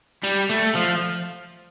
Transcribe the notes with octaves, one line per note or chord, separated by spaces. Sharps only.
G3
A3
F3